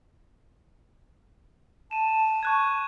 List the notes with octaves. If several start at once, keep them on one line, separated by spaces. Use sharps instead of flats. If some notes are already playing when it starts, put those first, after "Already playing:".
A5 D#7 E7
C#6 F#6 G#6